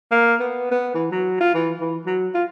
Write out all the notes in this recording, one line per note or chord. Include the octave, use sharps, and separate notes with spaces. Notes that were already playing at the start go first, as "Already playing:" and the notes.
A#3
B3
B3
E3
F#3
F4
E3
E3
F#3
F4